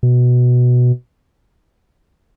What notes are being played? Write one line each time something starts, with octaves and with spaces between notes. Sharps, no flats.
B2